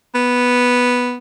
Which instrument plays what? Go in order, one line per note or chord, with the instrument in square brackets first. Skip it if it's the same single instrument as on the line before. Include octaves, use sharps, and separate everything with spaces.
[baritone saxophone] B3